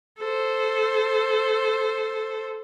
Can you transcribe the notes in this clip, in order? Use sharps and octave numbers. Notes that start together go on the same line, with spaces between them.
A4 C5